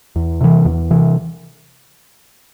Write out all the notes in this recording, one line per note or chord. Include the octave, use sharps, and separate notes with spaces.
E2
C3 E3
E2
C3 E3